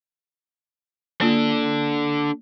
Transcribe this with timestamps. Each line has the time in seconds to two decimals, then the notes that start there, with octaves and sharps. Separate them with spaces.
1.21 A#3 D4 F4 A4